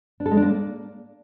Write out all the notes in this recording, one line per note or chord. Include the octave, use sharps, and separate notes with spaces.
D4
A4
G#3
D4
A#3